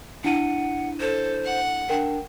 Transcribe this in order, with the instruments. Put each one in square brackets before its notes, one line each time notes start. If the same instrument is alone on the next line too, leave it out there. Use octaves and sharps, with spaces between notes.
[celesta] D4 E4 D#7 [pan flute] F#5
[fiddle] A4 [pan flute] C5
[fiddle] F#5
[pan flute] D4 [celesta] A#4 G5